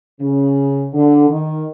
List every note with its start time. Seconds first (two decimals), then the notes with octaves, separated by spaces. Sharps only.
0.20 C#3
0.92 D3
1.29 D#3